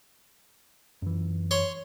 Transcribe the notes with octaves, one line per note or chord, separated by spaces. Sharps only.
F#2 E3
C#5 C6